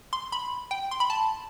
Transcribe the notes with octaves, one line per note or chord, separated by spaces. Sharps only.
C6
B5
G5
C6
B5
A5